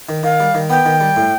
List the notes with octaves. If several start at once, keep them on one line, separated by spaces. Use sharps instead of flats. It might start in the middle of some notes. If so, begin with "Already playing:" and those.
D#3
D#3 F5
G3
D#3
B3 G5
D#3
G3
A2